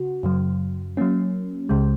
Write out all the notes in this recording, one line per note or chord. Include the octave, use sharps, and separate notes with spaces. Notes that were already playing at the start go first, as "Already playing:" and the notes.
Already playing: C#3 F#4
F#2 C#3 F#3
F#3 A#3 C#4
C#2 C#3 G#3